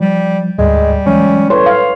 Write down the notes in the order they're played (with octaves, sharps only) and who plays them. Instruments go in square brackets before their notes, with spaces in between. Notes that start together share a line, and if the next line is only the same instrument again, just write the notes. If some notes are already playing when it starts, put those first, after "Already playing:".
[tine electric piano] F3 [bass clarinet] G3
[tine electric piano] D2 G#2 [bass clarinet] G3 [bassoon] G#3
[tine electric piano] E3 F#3 G#3 [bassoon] C#4
[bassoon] A2 [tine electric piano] B4 C6 [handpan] C#5
[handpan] F5